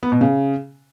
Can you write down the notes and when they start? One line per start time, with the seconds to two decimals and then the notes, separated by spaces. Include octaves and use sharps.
0.03 B3
0.12 B2
0.21 C#3